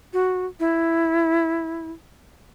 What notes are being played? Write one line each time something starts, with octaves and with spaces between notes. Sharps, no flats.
F#4
E4